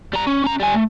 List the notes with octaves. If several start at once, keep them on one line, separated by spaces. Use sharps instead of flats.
G3 A#5
C#4
C#4 A#5
G3 G#5
A3